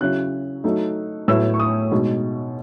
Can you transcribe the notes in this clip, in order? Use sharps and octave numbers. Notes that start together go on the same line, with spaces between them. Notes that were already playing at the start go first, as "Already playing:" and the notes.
C#3 F#3 C#4 E4 F#6
F#3 A3 D#4
A2 F#3 B3 E4 E6
C#6
D#6
B2 G#3 D#4